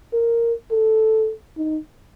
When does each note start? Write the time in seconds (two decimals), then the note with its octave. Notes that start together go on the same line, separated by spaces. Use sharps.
0.13 A#4
0.71 A4
1.57 D#4